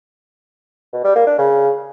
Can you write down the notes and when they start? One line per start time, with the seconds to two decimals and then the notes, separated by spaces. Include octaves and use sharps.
0.93 B2
1.04 G3
1.16 A#3
1.27 D4
1.38 C#3